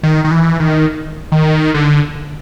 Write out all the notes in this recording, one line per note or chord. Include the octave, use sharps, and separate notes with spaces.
D#3
D#3
E3
D#3
D#3
D3